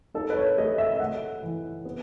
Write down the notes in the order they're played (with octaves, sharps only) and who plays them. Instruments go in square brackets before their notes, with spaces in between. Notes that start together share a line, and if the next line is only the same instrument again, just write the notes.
[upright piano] D#4 A4
B4
C#5
A3 D#5
E5
E5
A3 F#5
E3
B3